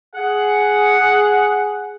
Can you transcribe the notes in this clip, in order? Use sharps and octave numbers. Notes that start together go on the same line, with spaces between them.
G#4 F#5